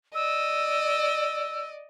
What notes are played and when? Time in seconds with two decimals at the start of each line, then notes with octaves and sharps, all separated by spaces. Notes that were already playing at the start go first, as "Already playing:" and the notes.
0.14 D5 D#5 E6